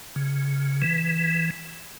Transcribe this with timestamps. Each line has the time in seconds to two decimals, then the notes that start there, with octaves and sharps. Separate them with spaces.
0.16 C#3
0.82 E3